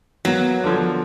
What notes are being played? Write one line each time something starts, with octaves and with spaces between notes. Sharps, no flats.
F#3 A#3 B3
D3 F3